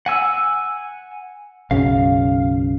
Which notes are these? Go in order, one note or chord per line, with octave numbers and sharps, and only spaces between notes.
F#5 G#5 E6
B1 F#2 C#3 F5